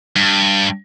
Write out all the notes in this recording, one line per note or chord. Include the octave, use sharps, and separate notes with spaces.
G2